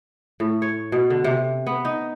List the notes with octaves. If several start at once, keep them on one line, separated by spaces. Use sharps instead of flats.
A2
C#5
B2
D3
C3
B3
D#4